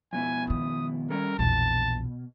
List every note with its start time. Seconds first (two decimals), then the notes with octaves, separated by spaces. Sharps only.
0.13 F2 B2 E4 G#5
0.50 D#3 D#6
1.10 G3 C#4 A4 A#4
1.39 A#1 E2 B2 A5